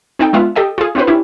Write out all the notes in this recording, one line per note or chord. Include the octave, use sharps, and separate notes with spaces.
C4 D#4 A4 G5
G#3 B3 D4 F4 E5 F#5
G4 A4 D#5 G5
F4 G#4
C4 D4 E4 F#4 B4 C5
C#4 D4 E4 G4